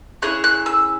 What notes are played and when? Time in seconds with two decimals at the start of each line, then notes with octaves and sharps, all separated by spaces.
0.22 C#4 E4 G#4 F#6
0.44 F#6
0.66 E6